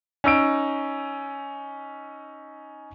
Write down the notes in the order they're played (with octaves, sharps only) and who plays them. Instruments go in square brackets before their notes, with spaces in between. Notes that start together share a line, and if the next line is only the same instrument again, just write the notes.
[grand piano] C#4 D#4 E6 D7